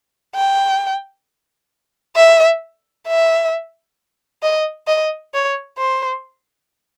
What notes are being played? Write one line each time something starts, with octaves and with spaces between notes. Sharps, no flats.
G5
E5
E5
D#5
D#5
C#5
C5